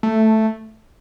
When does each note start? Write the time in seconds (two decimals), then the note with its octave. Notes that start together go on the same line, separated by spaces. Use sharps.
0.03 A3